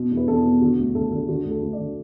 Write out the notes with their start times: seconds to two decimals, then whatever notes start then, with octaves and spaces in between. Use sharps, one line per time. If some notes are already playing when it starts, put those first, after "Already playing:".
Already playing: B2
0.11 E2
0.17 B4
0.27 E2 A4
0.45 B2
0.61 D3 F#4
0.78 D2
0.95 D2 A4
1.12 D3 A4
1.28 D3 F#4
1.44 D2
1.50 A4
1.62 D2
1.73 D5
1.78 D3